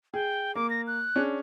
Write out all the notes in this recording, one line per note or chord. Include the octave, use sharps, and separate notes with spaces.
G#4 G5
A#3 D6
A#6
F#6
C#4 D4 G#4